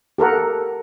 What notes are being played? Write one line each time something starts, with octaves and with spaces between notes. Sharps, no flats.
G4 A4 A#4 F#5